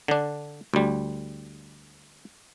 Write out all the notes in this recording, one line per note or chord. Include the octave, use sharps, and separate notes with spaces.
D3 D4
D2 G3